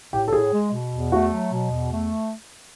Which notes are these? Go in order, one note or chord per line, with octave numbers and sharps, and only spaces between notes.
A2 G4
A4
A2 G#4
G#3
B2
E2
A3 F#4
F#3
B2
E2
A3